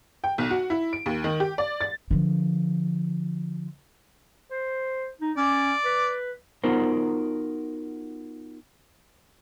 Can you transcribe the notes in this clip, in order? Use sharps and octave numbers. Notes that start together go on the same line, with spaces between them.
G5
B1
F#4
E4
D7
D#2
D#3
G4
D5
A6
D3 F3
C5
D#4
C#4 D5
B4
B3 D#4 F4 F#4 A#4 C5